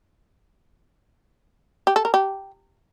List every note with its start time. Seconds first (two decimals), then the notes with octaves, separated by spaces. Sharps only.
1.87 G4
1.96 A4
2.05 A#4
2.14 G4